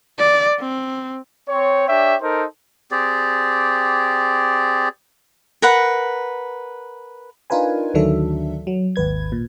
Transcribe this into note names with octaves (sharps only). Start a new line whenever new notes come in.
D5
C4
C4 C#5
D4 G4 C#5 E5 G5
D#4 A4 A#4 C5
C4 G4 G#4 D5
A#4 B4 F#5 B5
D4 D#4 F4 A#4 B4 G#5
D2 D#3 F#3 D4 A4 E5
F#3
G#1 D#2 B4 G#6
A#2